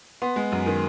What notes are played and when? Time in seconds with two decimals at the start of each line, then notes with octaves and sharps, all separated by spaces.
0.22 B3 C6
0.36 G#3
0.52 F#2
0.66 D#3